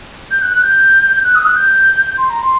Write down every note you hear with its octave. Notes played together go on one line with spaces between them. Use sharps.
G6
F#6
F#6
G6
F#6
D#6
F#6
G6
C6
A#5
C6